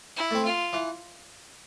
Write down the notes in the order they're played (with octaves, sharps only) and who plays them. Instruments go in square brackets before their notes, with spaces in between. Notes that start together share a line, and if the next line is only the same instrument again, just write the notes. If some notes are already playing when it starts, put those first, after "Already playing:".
[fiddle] E4
[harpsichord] A3 C4
[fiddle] F4
[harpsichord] E3